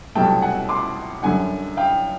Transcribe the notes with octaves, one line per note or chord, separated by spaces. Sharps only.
C2 B2 F#3 A3 G5 A5
F#5 G#5
C6 D6
F#2 D3 G3 F#5 G#5
F5 G5